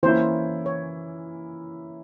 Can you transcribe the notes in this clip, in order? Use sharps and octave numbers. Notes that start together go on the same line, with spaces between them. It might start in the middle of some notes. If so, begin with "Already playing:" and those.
E3 A#3 C#4 E4 C5
C#5